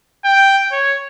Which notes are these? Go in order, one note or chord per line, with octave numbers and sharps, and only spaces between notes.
G5
C#5